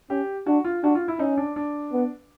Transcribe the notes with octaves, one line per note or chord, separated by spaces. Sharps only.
C#4 G4
D4 F#4
F4
D4 F#4
F4
E4
C#4 D#4
D4
D4
B3